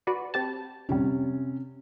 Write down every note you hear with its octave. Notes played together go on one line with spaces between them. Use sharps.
F#4 B4 D5
C4 G4 A5
A#1 F2 C3 G3 C#4